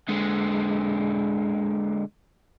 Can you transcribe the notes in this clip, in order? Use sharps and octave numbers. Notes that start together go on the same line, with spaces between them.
D3 G#3